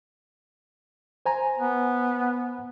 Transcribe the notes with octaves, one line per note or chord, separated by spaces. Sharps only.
C5 G#5 A#5
B3